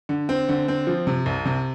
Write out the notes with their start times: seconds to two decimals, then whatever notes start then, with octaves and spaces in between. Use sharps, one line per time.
0.09 D3
0.29 C4
0.49 D3
0.68 C4
0.87 F3
1.07 C3
1.26 C2
1.46 C3